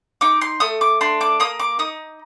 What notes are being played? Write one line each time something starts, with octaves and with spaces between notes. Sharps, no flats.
D#4 D6
C6
A3 D#6
D6
D4 C6
D6
A#3 D#6
D6
D#4 D#6